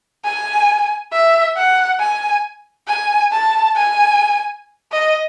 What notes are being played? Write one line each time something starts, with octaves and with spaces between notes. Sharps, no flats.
G#5
E5
F#5
G#5
G#5
A5
G#5
D#5